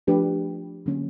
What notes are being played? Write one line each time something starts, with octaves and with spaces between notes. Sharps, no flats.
F3 A3 D4 G4 B4
D3 F#3 A#3 C#4